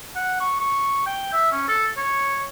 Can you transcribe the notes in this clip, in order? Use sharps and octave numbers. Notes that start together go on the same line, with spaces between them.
F#5
C#6
C#6
G5
E5
C#4
A4
C#5